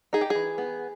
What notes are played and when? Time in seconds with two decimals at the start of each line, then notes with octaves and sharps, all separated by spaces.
0.13 D#4 G#4
0.21 G4
0.30 G#4
0.35 E3
0.58 B3